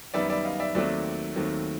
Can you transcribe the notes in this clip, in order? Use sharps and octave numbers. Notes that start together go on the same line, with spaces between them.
F#2 D#3 G3 B3 D5 E5
D5 E5
D#5 F5
D5 E5
D#2 D#3 F#3 A3 C4 D5 E5
D#2 D#3 F#3 A3 C4